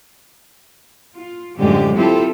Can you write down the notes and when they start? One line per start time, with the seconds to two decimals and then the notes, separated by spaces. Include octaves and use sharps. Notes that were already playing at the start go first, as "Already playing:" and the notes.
1.15 F4
1.57 F#2 A2 D3 F3 G#3 G4
1.97 C4 E4 F4 G4 A4